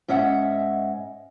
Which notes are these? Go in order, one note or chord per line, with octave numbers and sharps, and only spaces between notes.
G#2 C#4 D#5 E5 F#5